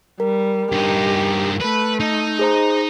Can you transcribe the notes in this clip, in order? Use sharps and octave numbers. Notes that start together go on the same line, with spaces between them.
G3 A#4
G2 D#4 G4
A3 B4
D#4 D#5
G#4 C5 A#5